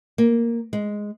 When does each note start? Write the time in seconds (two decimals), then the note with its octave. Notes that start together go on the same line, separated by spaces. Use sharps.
0.18 A#3
0.73 G#3